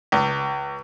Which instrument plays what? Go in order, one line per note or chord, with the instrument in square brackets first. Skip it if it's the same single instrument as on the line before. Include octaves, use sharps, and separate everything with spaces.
[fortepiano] C#2